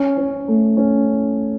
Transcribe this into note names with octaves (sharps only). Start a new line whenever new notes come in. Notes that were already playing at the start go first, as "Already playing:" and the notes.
Already playing: C#4
C#4
A3
C#4